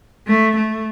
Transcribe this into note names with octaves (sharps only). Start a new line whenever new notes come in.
A3
A3